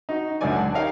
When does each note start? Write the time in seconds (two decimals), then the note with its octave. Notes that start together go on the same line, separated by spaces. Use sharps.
0.09 D#4 F#4
0.41 C#2 F#2 D3 F#3 D5 G#5
0.56 F#5 A5
0.75 D#4 G4 A#4 C#5 F5